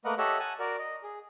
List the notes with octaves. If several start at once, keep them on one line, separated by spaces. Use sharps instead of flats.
A3 A#3 A#4 B4 D#5 F#5
G4 A4 C#5 D#5 E5 F#5
F#5 G#5 A5
F#4 A#4 D5
D#5
G#4